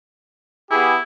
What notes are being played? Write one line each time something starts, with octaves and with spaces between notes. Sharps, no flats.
B3 E4 G4 G#4